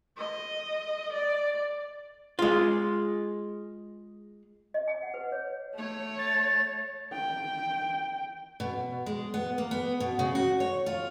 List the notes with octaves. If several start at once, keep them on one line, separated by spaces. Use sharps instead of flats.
D#5
D5
G#3 F4
D#5
G#5
F#5
B4
C#5
A3 C#5
A6
G5
B2
G#3
B3
A#3
B3
B2
C#3
F#4
C#5
F4